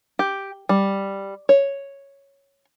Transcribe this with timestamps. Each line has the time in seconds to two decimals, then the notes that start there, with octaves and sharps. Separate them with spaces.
0.19 G4
0.69 G3
1.49 C#5